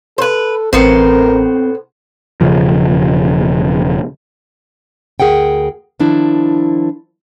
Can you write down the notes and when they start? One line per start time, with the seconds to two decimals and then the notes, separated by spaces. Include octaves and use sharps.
0.18 A4 B4 C5
0.73 A1 A2 B3 C4 A#4 C5
2.41 E1 D#2 C#3 F3
5.20 D2 G#4 A#4 F#5 G5
6.00 D#3 F3 D4 E4